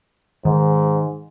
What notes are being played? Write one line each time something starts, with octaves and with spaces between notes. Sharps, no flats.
G#2 D#3